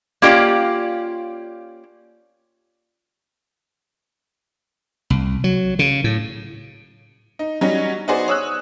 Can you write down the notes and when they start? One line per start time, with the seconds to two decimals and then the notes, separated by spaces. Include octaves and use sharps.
0.22 A#3 C#4 F4 G4 D5
5.10 C2
5.44 F#3
5.79 C#3
6.04 A2
7.39 D#4
7.61 F#3 G3 C#4 D#4
8.08 B3 D#4 F#4 G#4 C5 D5
8.28 C#5 D#6 E6 F#6